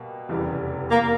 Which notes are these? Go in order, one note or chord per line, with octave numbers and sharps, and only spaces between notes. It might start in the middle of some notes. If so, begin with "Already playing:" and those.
Already playing: B2 G3 A#3
F1 E2 C#3 E3 G3
A#3